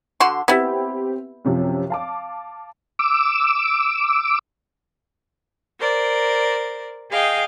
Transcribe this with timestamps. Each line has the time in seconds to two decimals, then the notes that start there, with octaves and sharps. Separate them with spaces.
0.20 D3 F#4 C6
0.48 B3 C4 E4 G4
1.45 F#2 C3 F3
1.90 F5 A5 D6
2.99 D6 E6
5.80 A#4 C5 D5
7.10 G#4 D#5 F5 G5